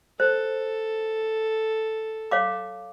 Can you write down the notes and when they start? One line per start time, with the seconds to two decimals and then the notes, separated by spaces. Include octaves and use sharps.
0.20 A4 C5
2.31 C#5 F5 D6